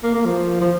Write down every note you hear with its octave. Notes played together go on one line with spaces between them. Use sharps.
A#3
A#3
F3
F3